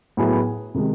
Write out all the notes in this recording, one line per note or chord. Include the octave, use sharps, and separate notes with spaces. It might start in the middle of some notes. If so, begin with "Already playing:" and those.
A2 F#3 B3 E4 G#4
C3 D#3 G#3